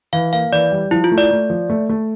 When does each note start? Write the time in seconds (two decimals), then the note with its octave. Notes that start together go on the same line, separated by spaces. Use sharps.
0.13 E3 F5
0.33 A#3 F5
0.52 E3 D5
0.72 G3
0.91 F3 E4
1.04 F4
1.11 A3
1.18 D5
1.31 A3
1.50 F3
1.69 A3
1.89 A3